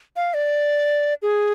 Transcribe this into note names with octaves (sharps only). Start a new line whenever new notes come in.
F5
D5
G#4